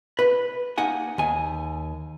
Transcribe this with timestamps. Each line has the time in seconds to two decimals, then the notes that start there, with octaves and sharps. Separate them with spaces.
0.19 B4
0.78 A#3 D#4 F#5 G#5
1.18 D#2 G#5